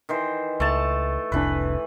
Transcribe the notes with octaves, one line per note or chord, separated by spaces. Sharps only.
D#3 E3 C5
C#2 A3 A5
F1 C2 E3 D4 B4